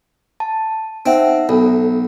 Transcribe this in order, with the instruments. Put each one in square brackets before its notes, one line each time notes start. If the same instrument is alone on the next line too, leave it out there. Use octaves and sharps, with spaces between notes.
[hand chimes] A5
[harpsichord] C4 [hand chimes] D#4 E5 F#5
[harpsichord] B1 [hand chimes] A4